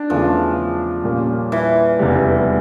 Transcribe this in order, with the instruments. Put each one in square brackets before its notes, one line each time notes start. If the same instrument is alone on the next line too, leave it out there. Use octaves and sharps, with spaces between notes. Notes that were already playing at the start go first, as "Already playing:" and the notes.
Already playing: [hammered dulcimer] D4 G4
[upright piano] E2 C#3 E3 A3 C#4 [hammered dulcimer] F3
[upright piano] A#2 G3 A#3 C#4
[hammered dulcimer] E3
[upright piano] F1 E2 C#3 G3